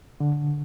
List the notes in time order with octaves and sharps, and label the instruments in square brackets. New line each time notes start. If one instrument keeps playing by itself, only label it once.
[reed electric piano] D3